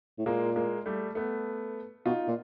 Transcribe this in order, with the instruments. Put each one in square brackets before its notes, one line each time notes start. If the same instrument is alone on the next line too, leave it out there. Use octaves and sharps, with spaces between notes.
[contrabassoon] A2
[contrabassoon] A#2 [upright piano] G#3 A#3
[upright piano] G#3 A#3
G3 A3
A3 B3
[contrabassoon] B2 [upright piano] D#4 F4
[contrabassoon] A#2